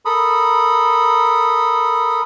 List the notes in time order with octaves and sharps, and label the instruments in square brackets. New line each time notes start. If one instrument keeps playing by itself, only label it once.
[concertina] A4 A#4 B5 D#6